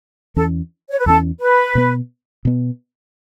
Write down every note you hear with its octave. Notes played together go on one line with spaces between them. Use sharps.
E2 E3 C#4 A4
C#5
B4
E2 E3 C#4 A4
B4
B2 B3
B2 B3